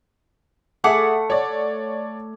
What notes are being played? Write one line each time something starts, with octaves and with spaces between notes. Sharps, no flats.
A3 G#4 E5 F#5 D6
C#5 D5